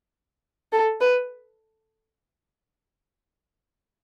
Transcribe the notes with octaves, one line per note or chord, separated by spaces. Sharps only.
A4
B4